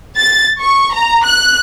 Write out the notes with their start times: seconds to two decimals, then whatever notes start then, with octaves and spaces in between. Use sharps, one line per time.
0.17 A6
0.61 C#6
0.93 A#5
1.24 F#6